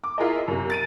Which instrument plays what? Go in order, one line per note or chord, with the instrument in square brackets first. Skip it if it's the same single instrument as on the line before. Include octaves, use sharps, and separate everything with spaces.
[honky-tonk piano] D6
E4 F4 G#4 A#4 D#5
F#2 C3
A6 D7 D#7